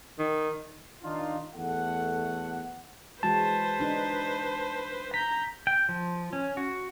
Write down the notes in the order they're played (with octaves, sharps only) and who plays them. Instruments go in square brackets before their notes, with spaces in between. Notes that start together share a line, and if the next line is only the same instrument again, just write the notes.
[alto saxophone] D#3
[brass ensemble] D#3 D4 D#4 F4
E2 A3 A4 F#5
[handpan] E3 G#3 F#4 [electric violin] B4 C5 [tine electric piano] A5
[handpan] D4 D#4
[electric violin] A#5 G6 [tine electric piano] B6
[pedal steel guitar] G5
F3
C#4
F#4